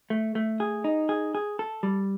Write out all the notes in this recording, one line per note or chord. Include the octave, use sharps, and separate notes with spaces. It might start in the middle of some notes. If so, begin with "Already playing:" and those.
A3
A3
G#4
D#4
G#4
G#4
A4
G3